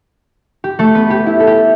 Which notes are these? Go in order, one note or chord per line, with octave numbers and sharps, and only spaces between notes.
G4
A3 A4
B3 B4
G4
E4
A4
G4